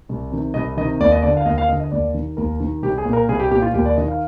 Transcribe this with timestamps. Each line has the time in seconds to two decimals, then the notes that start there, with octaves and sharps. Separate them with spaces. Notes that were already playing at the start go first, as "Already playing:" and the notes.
0.09 C2
0.32 C3 D#3
0.54 C2 D#5
0.77 D#3 D#5
0.81 C3
1.00 D#2 D5
1.12 D#5
1.22 D3 D5
1.37 F5
1.45 D#2 D#5
1.58 F5
1.68 D3 D#5
1.80 D#5
1.92 D#2 D5
2.14 D#3
2.37 D#2 A#4
2.60 D#3
2.82 C2 G4
2.98 G#4
3.05 A#2
3.13 A#4
3.29 C2 G#4
3.40 G4
3.51 A#2 G4
3.62 F4
3.74 D#2 G4
3.85 D5
3.97 D#3 D#5
4.08 F5